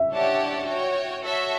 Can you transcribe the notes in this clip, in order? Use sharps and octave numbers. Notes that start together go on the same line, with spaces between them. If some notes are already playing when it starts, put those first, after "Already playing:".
Already playing: E5
D4 G4 C#5 F#5 A5
F#4 C#5 G5
F#4 A4 C#5 E5